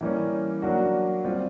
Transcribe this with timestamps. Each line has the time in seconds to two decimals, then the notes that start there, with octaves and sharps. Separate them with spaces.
0.01 E3 G3 A#3 C#4
0.62 F#3 A#3 D4 F#4
1.25 G3 C4 F4